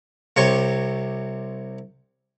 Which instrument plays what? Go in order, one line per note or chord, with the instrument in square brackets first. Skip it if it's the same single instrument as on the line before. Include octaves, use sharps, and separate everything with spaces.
[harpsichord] C2 C3 C#5 A#5 C6 C#6